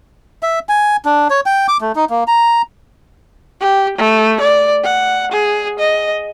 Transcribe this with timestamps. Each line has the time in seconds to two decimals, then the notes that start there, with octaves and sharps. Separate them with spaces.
0.43 E5
0.69 G#5
1.05 D4
1.30 C#5
1.46 G5
1.68 D6
1.81 A3
1.96 D#4
2.10 A#3
2.28 A#5
3.61 G4
3.98 A3
4.40 D5
4.84 F#5
5.32 G#4
5.79 D#5